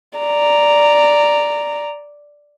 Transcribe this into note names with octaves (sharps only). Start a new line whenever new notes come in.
D5 A#5